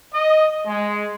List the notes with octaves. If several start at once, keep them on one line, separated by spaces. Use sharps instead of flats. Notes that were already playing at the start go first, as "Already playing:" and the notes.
D#5
G#3